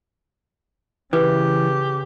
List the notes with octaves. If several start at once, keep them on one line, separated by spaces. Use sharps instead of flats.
C#3 E3 G4 B4